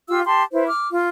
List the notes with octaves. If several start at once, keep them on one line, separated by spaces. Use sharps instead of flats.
F4 G4 F5 E6
G4 A5 C6
E4 B4 C5
D6 F6
F4